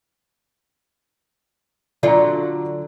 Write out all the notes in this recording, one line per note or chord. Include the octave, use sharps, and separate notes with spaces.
D3 F#3 F4 D5 A#5